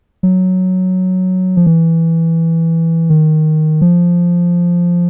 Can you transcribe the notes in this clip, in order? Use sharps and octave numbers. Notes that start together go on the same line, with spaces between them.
F#3
F3
E3
D#3
F3